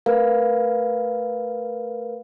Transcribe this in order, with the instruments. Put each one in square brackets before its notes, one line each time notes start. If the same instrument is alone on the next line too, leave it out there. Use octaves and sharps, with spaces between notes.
[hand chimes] A3 A#4 B4 F5